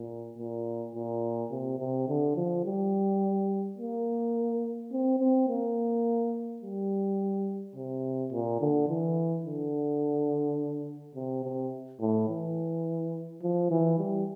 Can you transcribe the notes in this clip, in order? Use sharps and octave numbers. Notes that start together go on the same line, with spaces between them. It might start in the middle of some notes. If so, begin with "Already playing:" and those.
Already playing: A#2
A#2
A#2
C3
C3
D3
F3
G3
A#3
C4
C4
A#3
G3
C3
A#2
D3
E3
D3
C3
C3
A2
E3
F3
E3
G3